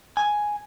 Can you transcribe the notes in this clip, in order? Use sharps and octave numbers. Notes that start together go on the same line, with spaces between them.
G#5